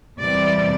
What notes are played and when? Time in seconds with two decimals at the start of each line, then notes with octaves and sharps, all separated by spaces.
0.19 E2 C3 G3 D5